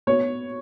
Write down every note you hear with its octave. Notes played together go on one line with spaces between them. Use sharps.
B3 C#5